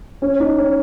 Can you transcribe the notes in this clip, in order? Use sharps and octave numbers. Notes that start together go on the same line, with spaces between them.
C#4
D#4
C#4